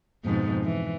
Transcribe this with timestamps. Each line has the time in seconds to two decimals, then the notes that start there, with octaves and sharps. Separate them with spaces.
0.25 F2 G#2 B2
0.64 E3